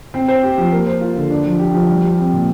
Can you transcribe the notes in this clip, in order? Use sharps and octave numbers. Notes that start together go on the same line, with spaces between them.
C4
C5
G4
F3
A#3
C5
F4
D3
D4
F3
G4
F3
G3
G4
C4
A#2